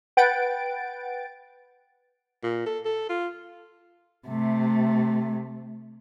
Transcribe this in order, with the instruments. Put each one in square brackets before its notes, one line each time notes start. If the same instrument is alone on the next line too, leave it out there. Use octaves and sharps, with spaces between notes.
[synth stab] B4 F#5 G5 A6 D7
[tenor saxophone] A#2
A4
A4
F4
[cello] C3 A3